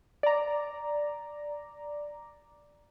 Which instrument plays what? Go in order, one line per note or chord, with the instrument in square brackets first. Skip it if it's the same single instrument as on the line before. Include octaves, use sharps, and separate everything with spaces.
[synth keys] D5 A#5